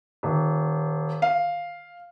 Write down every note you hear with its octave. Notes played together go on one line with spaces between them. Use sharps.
D#1
F5